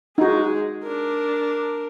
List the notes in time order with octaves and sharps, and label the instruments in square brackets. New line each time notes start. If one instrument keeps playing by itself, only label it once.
[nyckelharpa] G#3 G#4 [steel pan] D#4 F#4
[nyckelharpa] D4 A#4